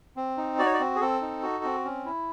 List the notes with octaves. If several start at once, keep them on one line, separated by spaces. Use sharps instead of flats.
C4
D#4
F#4 D5
C#5
D5
C4
G#4
C4 A4
D#4
F#4
C4
C#4
E4